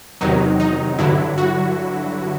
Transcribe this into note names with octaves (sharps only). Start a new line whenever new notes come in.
E2 C3 D#3 F#3 D#4
D#4
G2 D3 F#3 E4
F#4